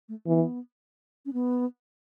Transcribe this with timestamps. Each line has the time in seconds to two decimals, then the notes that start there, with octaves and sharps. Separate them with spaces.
0.09 A3
0.26 E3 B3
1.26 C#4
1.33 B3